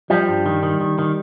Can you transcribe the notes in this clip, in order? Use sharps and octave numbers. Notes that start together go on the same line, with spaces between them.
F3 G3
G2
D#3
D#3
D#3
D#3